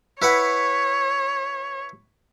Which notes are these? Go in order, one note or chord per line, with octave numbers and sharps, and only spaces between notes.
E4 B4 C#5 F#5